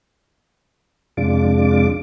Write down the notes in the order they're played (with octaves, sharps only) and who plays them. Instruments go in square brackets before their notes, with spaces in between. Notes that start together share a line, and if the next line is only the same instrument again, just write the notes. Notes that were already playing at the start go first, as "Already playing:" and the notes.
[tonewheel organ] F2 C3 G#3 D4 F4 D6